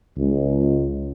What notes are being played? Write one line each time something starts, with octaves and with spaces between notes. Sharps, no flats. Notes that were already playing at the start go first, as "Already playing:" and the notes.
C#2